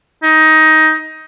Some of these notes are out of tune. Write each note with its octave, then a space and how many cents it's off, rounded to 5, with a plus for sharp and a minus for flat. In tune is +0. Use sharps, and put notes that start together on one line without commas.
D#4 +15